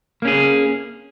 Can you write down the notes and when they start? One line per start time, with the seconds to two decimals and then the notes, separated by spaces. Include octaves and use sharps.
0.22 A#3
0.25 C#4
0.27 G#4